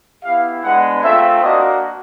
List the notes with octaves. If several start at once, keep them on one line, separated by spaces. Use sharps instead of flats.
B3 E4 G4 F5
G#3 B3 D4 F#5
A3 C4 F4 E5
A#3 D4 F#4 D#5